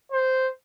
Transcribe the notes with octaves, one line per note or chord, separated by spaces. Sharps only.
C5